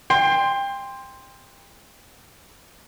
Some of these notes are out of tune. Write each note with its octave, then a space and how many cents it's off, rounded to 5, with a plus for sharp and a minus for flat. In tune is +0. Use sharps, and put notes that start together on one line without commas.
G5 +25 C6 +0